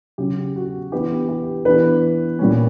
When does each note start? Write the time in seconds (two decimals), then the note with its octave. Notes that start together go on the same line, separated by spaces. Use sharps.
0.18 C#3 F#3 C#4 G4
0.56 F#4
0.92 E3 B3 D4 G4
1.29 G4
1.65 E3 B3 D4 B4
2.39 A#2 G3 C#4